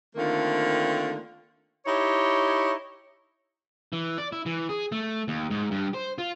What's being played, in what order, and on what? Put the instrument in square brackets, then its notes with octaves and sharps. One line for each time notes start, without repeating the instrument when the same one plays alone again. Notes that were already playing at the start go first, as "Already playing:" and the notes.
[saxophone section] D3 D#3 A3 A#3 C4 F4
D#4 E4 G4 C#5
[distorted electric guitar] E3
D5
E4
E3
G#4
A3
D#2
G#2
G2
C5
F4